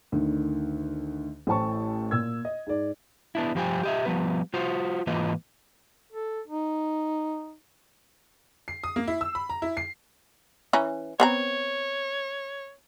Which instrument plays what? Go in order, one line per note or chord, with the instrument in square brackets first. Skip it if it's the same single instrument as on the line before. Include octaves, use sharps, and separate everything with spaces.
[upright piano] D2 D3 D#3
A1 A2 C5 G5 A5 C#6
A#2 E6 G#6
D#5
G#2 D5
[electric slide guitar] B3 D4 E4
G2 F3 G4 C5 G5 G#5
G4 D#5 E5
F3 G3 B3 B4
F4 F#4 C5
G#2 E3 A#3 F4 B4 D#5
[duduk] A4
D#4
[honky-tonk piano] C7
D#6
A#3
E4
E6
B5
A#5
E4
C7
[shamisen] E3 C#4 A#5
[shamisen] B3 C4 A#5 [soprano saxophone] C#5